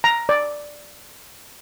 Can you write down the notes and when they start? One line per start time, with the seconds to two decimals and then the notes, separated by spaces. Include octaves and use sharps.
0.04 A#5
0.29 D5